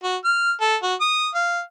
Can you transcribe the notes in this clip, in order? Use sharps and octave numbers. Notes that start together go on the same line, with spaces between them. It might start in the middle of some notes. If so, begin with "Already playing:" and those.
F#4
F6
A4
F#4
D#6
F5